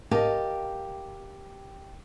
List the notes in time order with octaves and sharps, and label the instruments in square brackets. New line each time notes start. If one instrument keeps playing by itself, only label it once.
[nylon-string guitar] G4 A#4 D#5 F5 A5